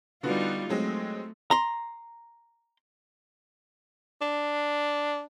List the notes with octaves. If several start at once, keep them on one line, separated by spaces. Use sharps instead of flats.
D3 G3 B3 D#4 F4 F#4
F#3 G#3 A3 C4
A#5 C6
D4